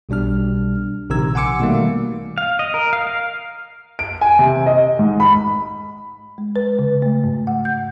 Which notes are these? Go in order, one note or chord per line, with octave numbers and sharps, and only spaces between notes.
B1 B2 G3 D4 F6
A#1 C3 D#3 A#5 E6 G#6
F#5 G#5 C6 D6 E6 C#7
B2 D#3 G3 A3 A#3
F5
D#5
A#4
F5
F5
D7
G#5
C3
D#5
G#2
B5
G#3
B4
C#3
A3
G#2
F#5
G6